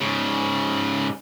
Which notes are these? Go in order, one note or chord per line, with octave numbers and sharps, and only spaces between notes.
G#2 C#3